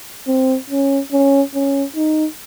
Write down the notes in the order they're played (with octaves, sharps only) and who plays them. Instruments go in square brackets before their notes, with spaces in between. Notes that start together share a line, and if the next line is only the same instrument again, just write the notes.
[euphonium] C4
C#4
C#4
C#4
D#4